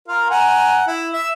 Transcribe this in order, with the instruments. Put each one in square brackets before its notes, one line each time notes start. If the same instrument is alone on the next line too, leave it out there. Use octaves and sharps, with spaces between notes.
[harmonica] F4 A#4 F5
F#5 G#5 A#5
E4
E5 E6